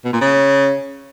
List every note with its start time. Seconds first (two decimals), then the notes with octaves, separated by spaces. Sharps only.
0.05 B2
0.13 A#2
0.21 C#3